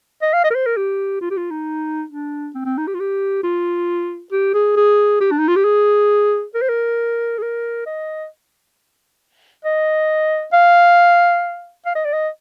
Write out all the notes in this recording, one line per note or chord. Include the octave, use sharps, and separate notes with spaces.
D#5
F5
D#5
A#4
C5
A#4
G4
F4
G4
F4
D#4
D4
C4
C4
D#4
G4
F4
G4
F4
G4
G#4
G#4
G4
D4
D#4
F4
G4
G#4
A#4
C5
A#4
G#4
A#4
D#5
D#5
F5
F5
D#5
D5
D#5